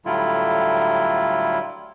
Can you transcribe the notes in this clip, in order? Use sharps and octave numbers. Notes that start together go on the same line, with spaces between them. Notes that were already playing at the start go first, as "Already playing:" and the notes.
A2 D3 F#3 G3 E4 F4